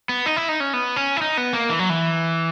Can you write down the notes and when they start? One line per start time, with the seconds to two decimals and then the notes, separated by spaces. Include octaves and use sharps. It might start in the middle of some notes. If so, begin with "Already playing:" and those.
0.09 B3
0.26 D#4
0.37 E4
0.49 D#4
0.60 C#4
0.73 B3
0.96 C#4
1.17 E4
1.21 D#4
1.38 B3
1.53 A#3
1.70 E3
1.79 F#3
1.90 E3